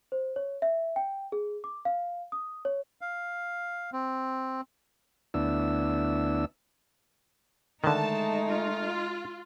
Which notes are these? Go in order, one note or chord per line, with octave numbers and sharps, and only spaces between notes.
C5
C#5
E5
G5
G#4
D6
F5
D#6
C#5
F5
C4
D2 B3 D4 E4 E6
D3 D#3 G#3 A3 D#4 A5
F4